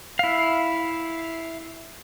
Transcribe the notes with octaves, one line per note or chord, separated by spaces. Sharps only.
E4 F5